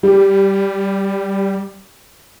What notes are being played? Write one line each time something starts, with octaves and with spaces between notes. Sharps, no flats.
G3 G4